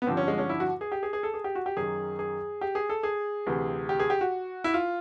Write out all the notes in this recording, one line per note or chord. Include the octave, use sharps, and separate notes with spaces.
B3
G2 D3 F3 C4
C#4
G#3
C#4
E4
F#4
G#4
G4
G#4
G#4
A4
G#4
G4
F#4
G4
F#2 D#3 G#4
G#4
G4
G#4
A4
G#4
D2 C3 E3
G4
G#4
G4
F#4
E4
F4